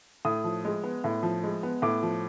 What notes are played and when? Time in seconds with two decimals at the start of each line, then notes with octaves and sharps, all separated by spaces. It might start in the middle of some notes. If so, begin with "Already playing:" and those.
0.25 A2 D#6
0.44 F3
0.65 G#3
0.83 B3
1.04 A2
1.23 F3
1.44 G#3
1.63 B3
1.82 A2 D6
2.03 F3